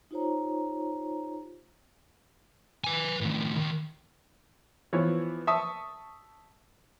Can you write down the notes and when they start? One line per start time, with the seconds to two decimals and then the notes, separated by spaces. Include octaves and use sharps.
0.11 D#4 F4 G4 C5 C#5 A#5
2.84 B4 G#5
3.21 A2 D#3
3.58 D#2
4.93 E3 F3 B3 C#5
5.47 E5 A5 C#6 D#6